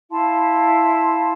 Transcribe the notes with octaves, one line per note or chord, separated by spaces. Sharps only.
E4 F5 A5 C6